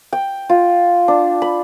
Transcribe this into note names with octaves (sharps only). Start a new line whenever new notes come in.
G5
F4
D4
B5